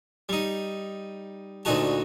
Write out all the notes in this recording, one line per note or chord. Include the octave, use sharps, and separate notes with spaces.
G3 D#4
D2 A#2 D#4 F#4 A5